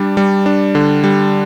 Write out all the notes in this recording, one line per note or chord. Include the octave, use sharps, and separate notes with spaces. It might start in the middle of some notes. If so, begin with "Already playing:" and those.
Already playing: G3 D4
G3
D4
D3
G3